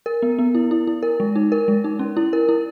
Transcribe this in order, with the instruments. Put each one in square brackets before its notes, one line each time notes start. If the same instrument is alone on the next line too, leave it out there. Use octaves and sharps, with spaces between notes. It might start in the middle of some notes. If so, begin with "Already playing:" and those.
[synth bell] A#4
B3
B3
E4
E4
E4
A#4
G#3
D#4
A#4
G#3
D#4
C#4
E4
A#4
E4